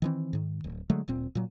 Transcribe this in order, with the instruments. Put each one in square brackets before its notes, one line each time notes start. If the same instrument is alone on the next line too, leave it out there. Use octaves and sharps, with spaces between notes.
[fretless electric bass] D#3 E3 C4
G#2 D#3
D1
D3 F#3 G#3 A3
D1 A#2 C4
A#2 F#3